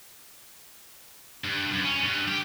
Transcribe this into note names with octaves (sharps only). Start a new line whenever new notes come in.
G2
F#2
C#4
G2
G4